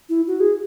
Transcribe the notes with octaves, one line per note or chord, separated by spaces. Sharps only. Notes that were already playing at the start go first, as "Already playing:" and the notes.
E4
F#4
G#4